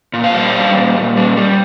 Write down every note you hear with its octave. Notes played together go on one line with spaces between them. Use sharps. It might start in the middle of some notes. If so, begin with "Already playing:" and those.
A#2
C5 F5
G3
G3
A#2
A#2
G3
G3